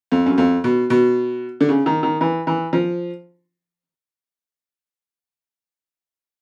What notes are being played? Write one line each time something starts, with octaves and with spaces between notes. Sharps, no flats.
F2
F#2
F2
B2
B2
D3
C#3
D#3
D#3
E3
E3
F3